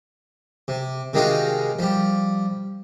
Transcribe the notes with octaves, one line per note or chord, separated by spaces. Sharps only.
C3
C3 D#3 G#3 D#4 F4 F#4
F3 G3